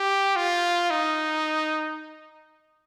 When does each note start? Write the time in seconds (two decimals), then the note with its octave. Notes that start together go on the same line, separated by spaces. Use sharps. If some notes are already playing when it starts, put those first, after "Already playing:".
Already playing: G4
0.36 F4
0.91 D#4